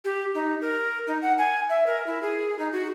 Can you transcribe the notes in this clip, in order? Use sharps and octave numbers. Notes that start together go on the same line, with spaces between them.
G4
D#4
A#4
D#4
F#5
G#5
E5
A#4
E4
G#4
D#4
F#4